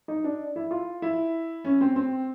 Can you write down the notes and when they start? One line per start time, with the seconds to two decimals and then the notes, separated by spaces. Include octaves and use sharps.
0.08 D#4
0.24 D4
0.56 E4
0.71 F4
1.02 E4
1.64 C#4
1.81 C4
1.96 C4